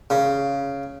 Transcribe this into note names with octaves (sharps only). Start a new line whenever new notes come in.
C#3